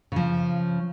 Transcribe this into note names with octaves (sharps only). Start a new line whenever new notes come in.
C#3 F3